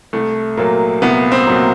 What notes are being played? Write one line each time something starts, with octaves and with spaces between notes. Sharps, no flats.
C2 A3
A#2 F#3 A#3
C2 B3
C4
A#2 F#3